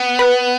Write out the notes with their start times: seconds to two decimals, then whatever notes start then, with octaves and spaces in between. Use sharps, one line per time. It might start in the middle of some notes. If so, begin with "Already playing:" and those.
Already playing: B3
0.19 B4